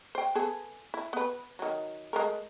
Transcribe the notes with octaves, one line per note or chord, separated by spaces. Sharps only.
C5 G5
B3 G#4 A4
E4
B3 B4
D#3 F#3
G#3 A3 A#4